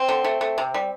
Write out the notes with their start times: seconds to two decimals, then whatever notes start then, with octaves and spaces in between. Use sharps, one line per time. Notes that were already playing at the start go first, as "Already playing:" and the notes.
Already playing: C4
0.09 D3
0.25 A3
0.41 A3
0.58 C3
0.74 G3